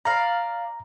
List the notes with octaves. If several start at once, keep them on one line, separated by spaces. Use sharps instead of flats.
D5 F5 A#5